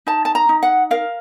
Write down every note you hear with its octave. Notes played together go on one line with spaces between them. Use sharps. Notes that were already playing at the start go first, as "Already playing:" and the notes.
D#4 A5
A5
A#5
D#4
F#5
A#4 F5